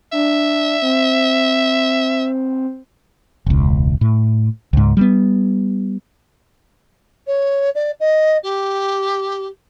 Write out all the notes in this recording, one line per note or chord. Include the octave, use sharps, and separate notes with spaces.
D4 E5
C4
E1 C#2
A2
C#2 G#2
G3 G#3 B3
C#5
D5
D#5
G4